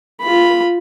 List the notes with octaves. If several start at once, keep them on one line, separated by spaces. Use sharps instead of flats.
F4 B5